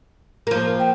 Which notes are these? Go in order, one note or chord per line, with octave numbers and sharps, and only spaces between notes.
F3 A#3
G5